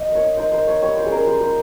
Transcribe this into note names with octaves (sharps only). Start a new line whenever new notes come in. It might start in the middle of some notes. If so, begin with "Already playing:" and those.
Already playing: D#5
A#3
C#5
D#4
D#4 C5
A#3 C5
A#3 C#5
G3 C#5
F4 C5
G#4
C#4 A#4
G3 C5
G3 C5